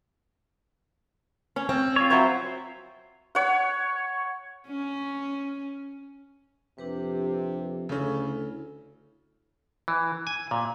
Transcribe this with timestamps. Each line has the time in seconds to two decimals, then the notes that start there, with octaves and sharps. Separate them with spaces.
1.56 C#4 C#5
1.69 C4 C#4
1.96 F4 C#5
2.10 F#3 E4 C5
3.35 C#5 F#5
4.68 C#4
6.78 F2 C3 D4 G4 B4
7.89 D2 C#3 C#4 E4 A4
9.88 E3
10.27 G#5
10.51 A#2